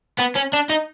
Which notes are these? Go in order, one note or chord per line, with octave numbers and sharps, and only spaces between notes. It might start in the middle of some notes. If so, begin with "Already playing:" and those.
B3
C#4
D4
D#4